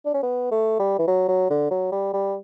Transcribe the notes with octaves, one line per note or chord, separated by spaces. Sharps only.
D4
C#4
B3
A3
G3
E3
F#3
F#3
D3
F#3
G3
G3